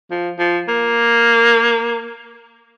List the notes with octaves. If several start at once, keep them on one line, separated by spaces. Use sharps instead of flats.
F3
F3
A#3